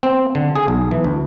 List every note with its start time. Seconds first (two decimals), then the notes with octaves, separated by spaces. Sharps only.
0.03 C4
0.35 D3
0.56 G#4
0.68 B1
0.91 E3
1.04 D2